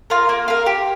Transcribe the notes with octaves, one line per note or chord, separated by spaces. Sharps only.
F4 A#4
A#3
F4 A#4
G4